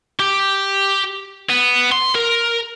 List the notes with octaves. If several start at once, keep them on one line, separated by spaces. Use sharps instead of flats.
G4
B3
C6
A#4